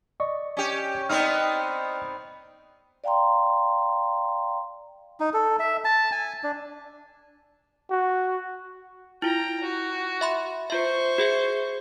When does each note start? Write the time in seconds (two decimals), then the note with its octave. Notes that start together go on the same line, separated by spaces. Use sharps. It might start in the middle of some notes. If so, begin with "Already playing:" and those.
0.20 D5 D#5 C#6
0.57 C#4 G4
1.09 B3 C4 D#4 D5 G5 F6
3.04 D5 F5 G5 A#5 C6
5.20 D#4
5.33 A4
5.59 E5
5.84 A5
6.12 G#5
6.44 D4
7.91 F#4
9.22 E4 F4 G5 A#5
9.64 F#4
10.21 E5 B5 C6
10.70 F4 C5 E5 C#6
11.18 F#4 G#4 E5